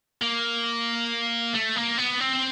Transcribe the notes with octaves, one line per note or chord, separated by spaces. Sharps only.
A#3
A3
A#3
B3
C4